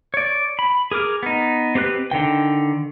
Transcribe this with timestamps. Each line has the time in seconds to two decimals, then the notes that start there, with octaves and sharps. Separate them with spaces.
0.14 C#5 D5
0.59 B5
0.91 G#4 A#4 D6 F6
1.23 B3 D#4
1.75 C4 G4 B4 F#6
2.11 D3 D#3 G5